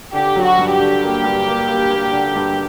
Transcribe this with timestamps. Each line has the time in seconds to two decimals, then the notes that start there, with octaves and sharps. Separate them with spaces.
0.13 D3 G4
0.36 F#3
0.43 F#4
0.58 G2
0.73 G4
0.80 D3
1.03 A#3
1.24 G2
1.47 A#3
1.68 A#3
1.90 A#3
2.12 D3
2.35 G2